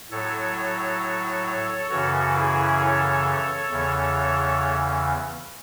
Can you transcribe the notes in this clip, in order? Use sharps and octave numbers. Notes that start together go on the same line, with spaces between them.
A2 F#3 A4 C#5
F#2 C#3 E3 F#4 A4
E4 G#4
A4 C#5
E2 C#3 E3